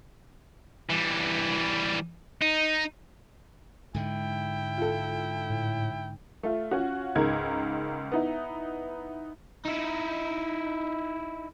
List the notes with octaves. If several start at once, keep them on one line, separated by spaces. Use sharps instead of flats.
E3 G3
D#4
G#2 D3 G#3 E4 G5
F4 A4
A2
A3 F4
C#4 F4 F#4
C#2 G#2 A#4 G#6
B3 D#4 E4
D#4 E4